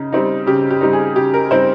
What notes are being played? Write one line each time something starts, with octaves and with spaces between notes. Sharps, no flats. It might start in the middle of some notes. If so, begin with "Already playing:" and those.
Already playing: C#3 D#4
G3 C4 D#4
C#3 G4
G4
G3 C4 D#4
G#4
C#3 G4
A#4
G3 C4 D#4 C5